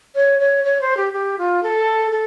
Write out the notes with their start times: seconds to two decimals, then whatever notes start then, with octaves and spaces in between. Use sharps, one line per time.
0.15 C#5
0.40 C#5
0.64 C#5
0.81 C5
0.97 G4
1.13 G4
1.38 F4
1.63 A4
2.11 A4